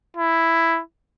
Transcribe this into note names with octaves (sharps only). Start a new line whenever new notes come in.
E4